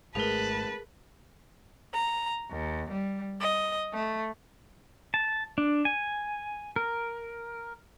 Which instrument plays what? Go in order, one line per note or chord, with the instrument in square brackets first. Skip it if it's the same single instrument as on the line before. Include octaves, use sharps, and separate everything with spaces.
[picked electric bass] G#1 G#3 A3 [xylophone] G#4 A#4 [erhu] B4 [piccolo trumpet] A5
[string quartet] A#5
D#2
G3
D#5
A3
[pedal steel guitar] A5
D4
G#5
A#4